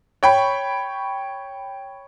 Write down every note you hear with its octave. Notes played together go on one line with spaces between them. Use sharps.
C#5 G5 B5 C#6